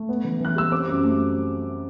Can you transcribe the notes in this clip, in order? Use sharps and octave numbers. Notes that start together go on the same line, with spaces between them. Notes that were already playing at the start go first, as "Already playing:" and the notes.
Already playing: A3
B3
E3
E3 F#6
G3 E6
C4 D6
F#2
A3